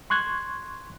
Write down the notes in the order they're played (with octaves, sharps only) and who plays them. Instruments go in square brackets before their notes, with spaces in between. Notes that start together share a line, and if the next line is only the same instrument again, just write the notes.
[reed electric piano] C6 C#6 F#6 G#6